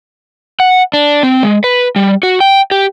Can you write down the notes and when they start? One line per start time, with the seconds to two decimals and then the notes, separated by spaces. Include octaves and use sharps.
0.60 F#5
0.93 D4
1.23 C4
1.43 G#3
1.64 B4
1.96 G3
2.23 F#4
2.40 G5
2.71 G4